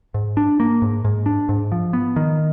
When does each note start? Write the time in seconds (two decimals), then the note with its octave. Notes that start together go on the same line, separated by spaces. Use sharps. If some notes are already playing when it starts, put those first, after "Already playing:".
0.14 G#2
0.37 D4
0.60 A#3
0.82 G#2
1.05 G#2
1.26 D4
1.49 G#2
1.72 F3
1.93 B3
2.16 D#3